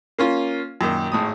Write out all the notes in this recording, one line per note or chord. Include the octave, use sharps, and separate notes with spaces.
A#3 C#4 F4
F#2 A#2 D#3
G#1 A2 D#6